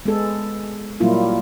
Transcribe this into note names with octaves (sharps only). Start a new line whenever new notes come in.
G#3 B3 A4
A#2 F#3 G3 A#3 E4 F4